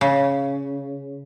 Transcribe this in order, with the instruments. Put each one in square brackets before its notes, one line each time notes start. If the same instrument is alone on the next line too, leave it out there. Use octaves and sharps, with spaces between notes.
[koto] C#3